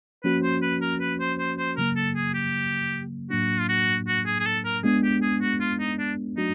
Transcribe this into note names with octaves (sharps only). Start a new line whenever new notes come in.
F3 A#3 C#4 F#4 B4
C5
B4
A#4
B4
C5
C5
C5
C#3 F#3 A#3 A#4
A4
G#4
G4
A2 F#3 A#3 D4 F#4
F4
F#4
F#4
G#4
G#4
A4
A#4
G#3 B3 D4 G#4
G4
G#4
F#4
F4
D#4
D4
F#3 A3 D4 D#4 F#4